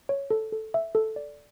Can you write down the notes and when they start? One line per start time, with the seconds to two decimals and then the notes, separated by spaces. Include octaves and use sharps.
0.09 C#5
0.31 A4
0.52 A4
0.74 E5
0.95 A4
1.16 D5